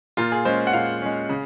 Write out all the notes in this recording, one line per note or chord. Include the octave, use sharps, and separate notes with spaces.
A#2 F4
G#4
G#3 C#4 C5
F#5
A#2 F5
G#3 C#4
C#3